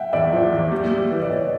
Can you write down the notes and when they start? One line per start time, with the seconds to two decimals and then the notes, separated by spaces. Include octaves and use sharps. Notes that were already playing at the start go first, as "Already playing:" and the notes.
Already playing: E5 F#5 G5
0.13 E2 D5 E5
0.33 F3
0.52 E2
0.72 G3
0.91 G3
1.10 E3
1.22 D5
1.30 E3 C#5 D#5